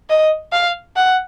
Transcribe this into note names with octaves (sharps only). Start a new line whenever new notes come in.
D#5
F5
F#5